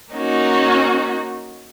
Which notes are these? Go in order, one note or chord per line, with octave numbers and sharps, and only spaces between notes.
A#3 C#4 D#4 F#4